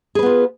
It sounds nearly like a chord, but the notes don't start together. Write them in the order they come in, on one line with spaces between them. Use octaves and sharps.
G#4 B4 B3 F4